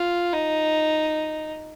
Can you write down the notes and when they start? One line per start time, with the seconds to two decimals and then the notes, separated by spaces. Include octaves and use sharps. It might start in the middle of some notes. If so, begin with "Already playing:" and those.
Already playing: F4
0.33 D#4